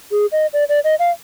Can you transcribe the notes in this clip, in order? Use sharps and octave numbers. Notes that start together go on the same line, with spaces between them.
G#4
D#5
D5
D5
D#5
F5